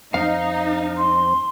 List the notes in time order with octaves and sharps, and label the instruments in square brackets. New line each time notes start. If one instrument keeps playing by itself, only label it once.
[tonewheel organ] F2 C4 [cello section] D#4 [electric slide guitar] F5
[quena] C6